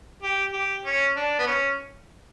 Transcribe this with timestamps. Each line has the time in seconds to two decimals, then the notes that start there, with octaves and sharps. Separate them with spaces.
0.22 G4
0.53 G4
0.85 C#4
1.16 D4
1.39 B3
1.47 C#4